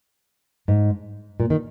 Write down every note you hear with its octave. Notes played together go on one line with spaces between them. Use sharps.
G#2
A#2
D#3